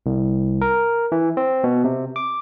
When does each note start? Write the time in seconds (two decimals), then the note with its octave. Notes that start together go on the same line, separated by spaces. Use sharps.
0.06 C2
0.62 A#4
1.12 E3
1.37 C4
1.64 B2
1.84 C3
2.16 D6